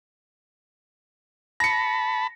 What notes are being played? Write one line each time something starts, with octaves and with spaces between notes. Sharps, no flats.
A5 B5 A#6 C#7